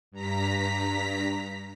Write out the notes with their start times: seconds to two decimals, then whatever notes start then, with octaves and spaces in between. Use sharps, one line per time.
0.12 G2 A#5 B6